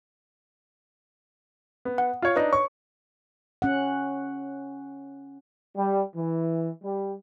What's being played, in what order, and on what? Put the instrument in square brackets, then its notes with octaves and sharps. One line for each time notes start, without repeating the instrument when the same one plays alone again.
[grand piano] B3
[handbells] F#5
[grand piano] F4 C#5
[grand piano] D4 D#4 [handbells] B4 D#5
[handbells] C#5 [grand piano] C#6
[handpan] C#4 F#5
[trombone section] G3
E3
G3